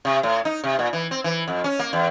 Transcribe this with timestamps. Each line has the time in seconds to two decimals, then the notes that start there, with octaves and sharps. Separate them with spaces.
0.05 C3
0.23 A2
0.45 D#4
0.64 C3
0.79 A#2
0.93 E3
1.11 C4
1.24 E3
1.48 F2
1.64 C#4
1.79 A#3
1.93 E2